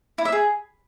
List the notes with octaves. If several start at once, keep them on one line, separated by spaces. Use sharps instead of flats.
E4
E5
G#4